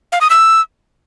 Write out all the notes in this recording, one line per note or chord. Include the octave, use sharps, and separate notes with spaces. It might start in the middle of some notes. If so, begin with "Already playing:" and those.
F5
D#6
E6